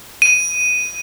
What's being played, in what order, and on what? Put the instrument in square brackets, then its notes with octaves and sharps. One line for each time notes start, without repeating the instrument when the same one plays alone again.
[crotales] D#7